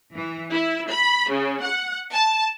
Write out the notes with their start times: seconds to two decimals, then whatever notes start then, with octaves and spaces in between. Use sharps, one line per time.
0.15 E3
0.52 E4
0.90 B5
1.30 C#3
1.63 F#5
2.13 A5